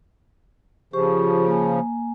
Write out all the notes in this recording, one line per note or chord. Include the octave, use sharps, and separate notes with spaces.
C#3 F3 G4 C5 C#6
A#3 G#5